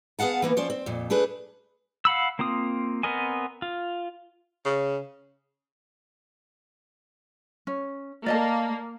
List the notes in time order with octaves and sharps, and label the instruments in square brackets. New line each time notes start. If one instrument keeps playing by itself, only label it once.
[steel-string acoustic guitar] B3 G#4 F5 F#5 A5
E3 A#3 B3
F3 C#4 C5 D5
C4
F2 A#2
A3 D4 G#4 B4
[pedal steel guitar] F5 F#5 B5 E6
A#3 C4 F4 D#6
B3 C4 A#4 D#5 G#5
F4
[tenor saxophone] C#3
[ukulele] C#4
[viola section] A#3 [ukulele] D5 D#5 A5